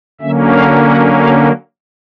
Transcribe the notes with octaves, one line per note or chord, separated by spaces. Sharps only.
D3 F#3 A#3 C#4 E5
F5
F#5
F5